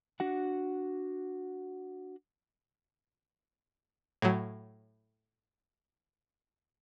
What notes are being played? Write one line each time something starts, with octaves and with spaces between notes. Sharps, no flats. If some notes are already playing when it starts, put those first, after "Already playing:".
D4 F#4 F#5
A2 F#3